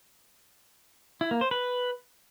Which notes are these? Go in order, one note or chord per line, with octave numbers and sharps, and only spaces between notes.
E4
A#3
C5
B4